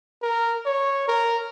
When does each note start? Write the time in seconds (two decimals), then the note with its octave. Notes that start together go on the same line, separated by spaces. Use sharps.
0.22 A#4
0.66 C#5
1.08 A#4